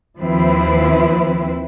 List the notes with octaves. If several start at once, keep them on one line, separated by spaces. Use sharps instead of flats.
D#2 F3 C4 E4 B4